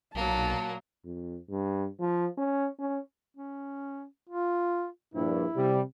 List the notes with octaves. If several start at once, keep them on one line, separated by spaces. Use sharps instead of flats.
B1 A#2 F#3 A#3 A5
F2
G2
F3
C#4
C#4
C#4
F4
A#1 G2 E4
C3 G3